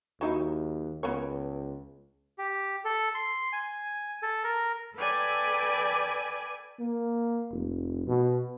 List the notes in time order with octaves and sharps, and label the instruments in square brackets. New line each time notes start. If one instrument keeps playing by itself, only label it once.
[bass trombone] D#2 [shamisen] F#3 D#4 E4
[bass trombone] C#2 [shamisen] B3 A#4 C#5
[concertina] G4
A4
C6
G#5
A4
A#4
[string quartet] A4 B4 D5 G5 G#5
[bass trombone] A#3
F1
B2